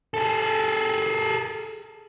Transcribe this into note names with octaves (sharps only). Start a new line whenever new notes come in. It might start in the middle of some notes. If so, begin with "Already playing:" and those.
G#4 A4